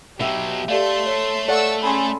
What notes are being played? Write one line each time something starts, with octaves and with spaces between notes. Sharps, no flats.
B2 F#3 G4 E5
A3 G4 A4 D5 F5 C6
C#5
A4 D5 F5 F#5 C#6 E6
C#4 G#4 A4 B5 C6